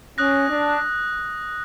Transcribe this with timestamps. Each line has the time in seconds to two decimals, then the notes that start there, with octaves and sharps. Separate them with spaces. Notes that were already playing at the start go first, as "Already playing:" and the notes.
0.18 C#4 D#6 F#6 A#6
0.49 D4